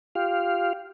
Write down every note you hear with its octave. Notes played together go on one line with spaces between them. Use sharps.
F4 G4 F5